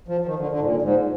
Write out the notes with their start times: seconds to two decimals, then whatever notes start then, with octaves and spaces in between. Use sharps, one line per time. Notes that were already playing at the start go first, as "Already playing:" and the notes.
0.08 F3
0.21 F3
0.26 D#3
0.39 D3
0.51 D3
0.60 G#2
0.63 A#2
0.82 G#2